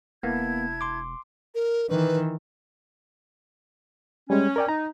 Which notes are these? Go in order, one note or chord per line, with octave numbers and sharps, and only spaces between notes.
E1 A#3 B3 E4 A5 G#6
C6 D6
A#4
D#3 E3 B4
G3 G#3 C#4
A#4 D5 G5
D#4 A#5